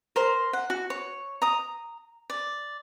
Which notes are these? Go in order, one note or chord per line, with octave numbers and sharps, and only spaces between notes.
A#4 C5 C6
F#5
F#4
C#5
A#5 D#6
D5